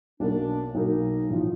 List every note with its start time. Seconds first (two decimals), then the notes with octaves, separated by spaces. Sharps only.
0.20 B1 B2 F#3 A#3 D4
0.75 B1 B2 F#3 A#3 D#4
1.30 A1 F3